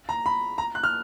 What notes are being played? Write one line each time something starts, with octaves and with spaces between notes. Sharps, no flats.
A#5
B5
A#5
F#6
F6